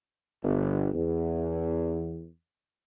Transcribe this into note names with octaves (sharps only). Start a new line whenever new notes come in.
G1
E2